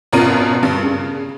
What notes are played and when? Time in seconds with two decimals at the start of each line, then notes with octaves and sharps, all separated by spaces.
0.13 G#1 F#2 B2 F4 A#4 D#7
0.63 G2
0.83 C#3